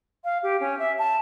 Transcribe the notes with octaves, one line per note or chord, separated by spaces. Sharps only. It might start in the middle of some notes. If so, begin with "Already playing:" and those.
F5
G4
C#4
E5
A5